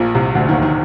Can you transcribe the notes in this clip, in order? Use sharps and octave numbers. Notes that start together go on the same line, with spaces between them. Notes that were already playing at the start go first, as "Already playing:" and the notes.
Already playing: A#1 A#2
C2 C3
D2 D3
D#2 D#3
D#3